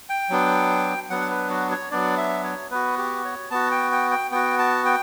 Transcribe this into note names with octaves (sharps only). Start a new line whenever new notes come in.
G5
F#3 B3 D4
F#3 B3 D4 F#5
B4
F#4
C#5
F#3 B3 D4 D5
E5
C#5
B3 F#4 B4
G4
C#5
B3 F#4 A5
G5
G5
G5
B3 F#4 G5
A5
G5